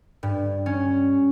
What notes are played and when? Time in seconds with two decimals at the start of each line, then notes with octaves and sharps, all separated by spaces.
0.23 G2
0.66 C#4